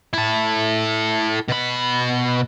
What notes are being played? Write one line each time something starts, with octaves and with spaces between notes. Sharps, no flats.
E4 A4
B2 B5